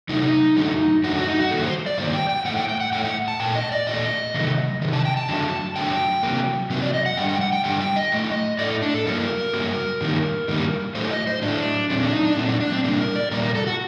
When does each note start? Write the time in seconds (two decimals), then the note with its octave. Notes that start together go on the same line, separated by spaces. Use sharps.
0.09 C3 F#3 A3 D#4
0.56 F#2 D3 F#3 A3
1.04 F#2 D3 F#3 A3 F#4
1.16 F#4
1.27 D#4
1.39 F#4
1.51 G2 D#3 F#3 A#3 A4
1.63 C5
1.86 D5
1.98 G2 D#3 F#3 A#3 C5
2.13 G5
2.29 G5
2.45 A2 A3 F#5
2.57 G5
2.69 G5
2.80 F#5
2.92 A2 A3 G5
3.04 F#5
3.28 A5
3.40 A#2 A3 G5
3.55 D#5
3.72 D5
3.87 A#2 A3 D#5
4.34 C3 D#3 F#3 A3
4.82 C3 D#3
4.93 A5
5.05 G5
5.17 A5
5.29 F#2 D3 F#3 A3
5.76 F#2 D3 F#3 A3 G5
6.23 C3 F#3 A#3
6.70 C3 F#3 A#3
6.82 D5
6.94 D#5
7.06 F#5
7.17 G2 D3 G3 G5
7.29 G5
7.41 F#5
7.53 G5
7.64 G2 D3 G3 G5
7.81 G5
7.96 D#5
8.12 A2 A3
8.59 A2 A3 D5
8.82 D4
8.94 A4
9.06 G2 F#3 A#3 A#4
9.53 G2 F#3 A#3
10.01 G2 D#3 G3 A#3
10.48 G2 D#3 G3 A#3
10.95 A2 F#3 A3 C5
11.11 D#5
11.27 C5
11.42 A2 F#3 A3 D4
11.89 A#2 F#3 A3 C4
12.02 D4
12.13 D#4
12.25 D4
12.37 A#2 F#3 A3 C4
12.49 D4
12.60 D4
12.72 C4
12.84 A#2 G3 A#3 D4
13.00 A#4
13.16 D5
13.31 A#2 G3 A#3 A#4
13.43 A#4
13.55 A4
13.67 F#4